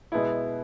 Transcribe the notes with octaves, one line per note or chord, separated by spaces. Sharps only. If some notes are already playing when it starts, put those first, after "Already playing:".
B2 G#3 B3 E4